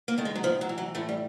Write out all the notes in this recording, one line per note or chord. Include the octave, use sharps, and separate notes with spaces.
A#3
D#3 A3
G#3
F#3
A2 F3
F#3
E3
F#3
A2 A3
G3